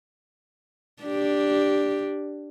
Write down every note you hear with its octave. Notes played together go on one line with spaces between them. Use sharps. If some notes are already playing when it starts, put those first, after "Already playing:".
D4 G4